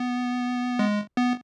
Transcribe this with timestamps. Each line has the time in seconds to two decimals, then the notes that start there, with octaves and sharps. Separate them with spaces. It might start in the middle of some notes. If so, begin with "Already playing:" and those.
Already playing: B3
0.79 G#3
1.17 B3